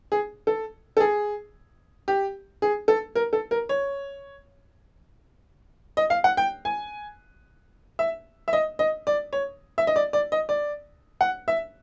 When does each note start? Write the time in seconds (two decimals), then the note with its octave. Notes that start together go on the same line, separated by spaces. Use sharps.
0.12 G#4
0.47 A4
0.97 A4
1.00 G#4
2.08 G4
2.62 G#4
2.88 A4
3.15 A#4
3.33 A4
3.51 A#4
3.69 C#5
5.97 D#5
6.10 F5
6.24 F#5
6.37 G5
6.65 G#5
7.99 E5
8.48 E5
8.53 D#5
8.79 D#5
9.07 D5
9.33 C#5
9.78 E5
9.87 D#5
9.96 D5
10.13 D5
10.32 D#5
10.49 D5
11.21 F#5
11.48 E5